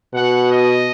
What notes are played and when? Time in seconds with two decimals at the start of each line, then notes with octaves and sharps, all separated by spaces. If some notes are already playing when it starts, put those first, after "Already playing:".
0.13 B2 F#5
0.50 D#5